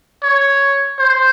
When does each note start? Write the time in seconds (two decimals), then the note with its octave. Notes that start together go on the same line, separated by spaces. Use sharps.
0.23 C#5
0.99 C5